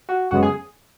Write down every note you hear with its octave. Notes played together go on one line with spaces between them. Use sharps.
F#4
F#2 C#3 G#3 B3 F#4
G#4